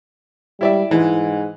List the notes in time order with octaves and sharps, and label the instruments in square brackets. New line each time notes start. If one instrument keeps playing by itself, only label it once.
[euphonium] G3 [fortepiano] E4 D5 E5
[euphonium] G#2 [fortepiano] E3 G#3